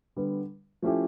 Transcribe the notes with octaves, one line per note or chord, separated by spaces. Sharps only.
D3 G3 B3
F3 A3 C#4 E4 G4